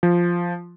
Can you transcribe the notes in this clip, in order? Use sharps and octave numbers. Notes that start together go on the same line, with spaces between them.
F3